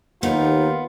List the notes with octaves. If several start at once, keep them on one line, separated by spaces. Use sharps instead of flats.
D#2 B3 D#4 F4